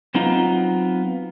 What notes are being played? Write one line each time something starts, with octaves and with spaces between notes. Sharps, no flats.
F#3 B3 C4 D#4 F4